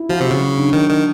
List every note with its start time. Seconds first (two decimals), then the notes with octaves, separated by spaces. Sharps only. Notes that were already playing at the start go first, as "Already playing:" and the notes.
Already playing: E4
0.09 F3 F#4
0.20 C3
0.25 F#4
0.31 C#3
0.41 F#3
0.58 D4
0.73 D#3 D4
0.90 D#3 D4